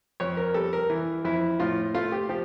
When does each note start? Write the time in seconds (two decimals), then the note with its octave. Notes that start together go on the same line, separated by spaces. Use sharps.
0.20 F2 C#5
0.37 A#4
0.54 G3 A4
0.73 A#4
0.90 E3
1.25 F2 E4
1.60 A2 F4
1.94 A3 F4
2.12 G4
2.29 F3 G4